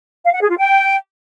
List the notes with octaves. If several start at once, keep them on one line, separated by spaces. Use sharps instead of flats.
F5
F#5
G#4
F4
G5